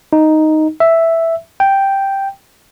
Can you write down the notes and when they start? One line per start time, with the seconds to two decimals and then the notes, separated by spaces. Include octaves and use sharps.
0.13 D#4
0.80 E5
1.60 G5